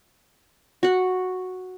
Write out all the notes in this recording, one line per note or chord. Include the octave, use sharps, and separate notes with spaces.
F#4 F#5